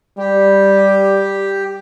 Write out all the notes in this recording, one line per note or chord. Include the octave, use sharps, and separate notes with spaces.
G3 G4